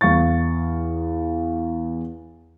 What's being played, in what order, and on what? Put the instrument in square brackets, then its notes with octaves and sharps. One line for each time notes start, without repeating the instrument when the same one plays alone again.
[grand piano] E2 F5 C#6 A6